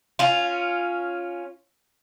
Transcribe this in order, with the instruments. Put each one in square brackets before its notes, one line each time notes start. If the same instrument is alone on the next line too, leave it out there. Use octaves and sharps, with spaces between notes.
[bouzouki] C#4 F4